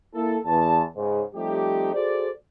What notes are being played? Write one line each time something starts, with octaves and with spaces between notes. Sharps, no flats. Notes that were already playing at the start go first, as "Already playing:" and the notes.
A#3 E4 A4
E2 A5
G#2 C#3
F3 G3 A3 C4 D#4 G4
F#4 G#4 A4 C5 D5